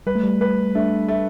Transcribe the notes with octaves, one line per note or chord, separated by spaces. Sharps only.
G3 B4
A3
G3
B4
A3 D4
A3